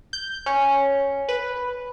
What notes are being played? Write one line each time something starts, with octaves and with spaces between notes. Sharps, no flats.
G6
C#4
B4